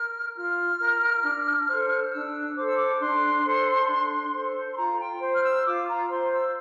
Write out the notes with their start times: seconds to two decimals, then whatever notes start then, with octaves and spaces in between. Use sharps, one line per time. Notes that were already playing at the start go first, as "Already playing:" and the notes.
Already playing: A#4 F6
0.36 F4 F6
0.79 A#4
1.24 D4
1.67 A4 C5
2.12 D4 E6
2.56 A4 C5 D6
2.67 E6
2.77 D6
3.00 D4 C6
3.44 A4 C5
3.88 D4
4.33 A4 C5
4.73 C6
4.77 F4 A#5
5.00 G5
5.21 C5
5.34 F6
5.43 E6
5.65 F4 D6
5.87 A#5
6.09 C5 C6
6.32 E6